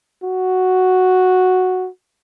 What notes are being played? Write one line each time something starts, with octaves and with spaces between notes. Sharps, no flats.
F#4